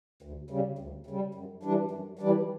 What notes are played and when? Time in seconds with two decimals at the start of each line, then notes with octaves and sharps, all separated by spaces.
0.22 D2
0.50 C#3 G3
0.79 D2
1.06 C#3 G3
1.35 F#2
1.63 E3 G3 D4
1.91 F#2
2.19 E3 G3 D4